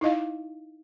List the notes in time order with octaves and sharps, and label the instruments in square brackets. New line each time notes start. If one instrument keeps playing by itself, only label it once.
[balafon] D#4 E4 D#5 F5